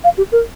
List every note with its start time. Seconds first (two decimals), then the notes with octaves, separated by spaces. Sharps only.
0.04 F5
0.18 G4
0.32 A#4